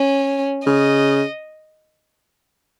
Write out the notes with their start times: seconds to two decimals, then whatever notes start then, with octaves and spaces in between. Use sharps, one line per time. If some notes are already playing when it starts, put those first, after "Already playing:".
Already playing: C#4
0.67 C#3 D#5